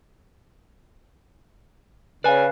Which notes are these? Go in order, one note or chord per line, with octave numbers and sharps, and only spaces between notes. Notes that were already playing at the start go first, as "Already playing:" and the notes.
C#3 B4 D5 F5 G#5